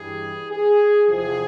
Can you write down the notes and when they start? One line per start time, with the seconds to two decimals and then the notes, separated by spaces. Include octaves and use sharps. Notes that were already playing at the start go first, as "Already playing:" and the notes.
Already playing: G2 E3 G3 G#4
0.50 G#4
1.07 E2 C3 F3 G#4